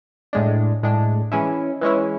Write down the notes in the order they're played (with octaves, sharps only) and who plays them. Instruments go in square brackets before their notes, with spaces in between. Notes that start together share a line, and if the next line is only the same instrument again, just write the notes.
[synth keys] A2 G#3 D4
A2 G#3 D4
E3 G#3 C#4 E4
E3 G#3 C#4 E4